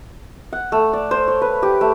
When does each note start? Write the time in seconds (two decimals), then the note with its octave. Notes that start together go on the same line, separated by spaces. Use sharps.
0.53 F#5
0.72 A3
0.93 D5
1.11 C5
1.28 C#5
1.42 B4
1.63 G4
1.81 A3